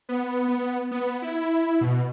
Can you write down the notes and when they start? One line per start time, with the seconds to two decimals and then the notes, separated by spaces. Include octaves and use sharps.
0.09 B3
0.48 B3
0.91 B3
1.22 E4
1.81 B2